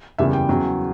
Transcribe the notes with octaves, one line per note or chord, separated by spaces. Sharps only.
F#1 E2 C#3 G3 E5
G5
E2 C#3 F#3